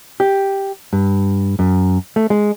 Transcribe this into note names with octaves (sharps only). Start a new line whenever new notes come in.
G4
G2
F#2
A3
G#3